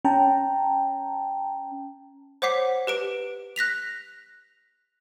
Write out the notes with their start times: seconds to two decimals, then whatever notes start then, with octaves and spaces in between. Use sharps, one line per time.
0.05 C#4 G5 A5 A#5
2.42 C5 C#5 F#5 D6 B6 C7
2.87 G4 B4 D7
3.56 F#6 A#6 B6 F7